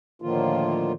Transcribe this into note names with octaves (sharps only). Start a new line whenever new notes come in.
A2 D3 D#3 F3 A#3 F4